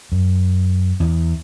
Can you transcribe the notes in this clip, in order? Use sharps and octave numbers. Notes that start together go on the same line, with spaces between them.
F#2
E2